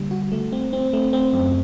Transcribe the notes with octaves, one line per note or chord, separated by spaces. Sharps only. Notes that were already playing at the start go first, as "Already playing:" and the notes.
Already playing: D3 G3 A#3
F#4
A3
C4
C4
A3
C4
F#2